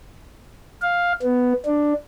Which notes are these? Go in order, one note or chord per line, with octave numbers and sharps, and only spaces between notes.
F5
B3
D4